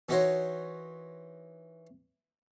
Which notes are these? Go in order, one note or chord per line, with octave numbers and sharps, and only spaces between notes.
E3 D#4 F#4 A#4 C5 C#5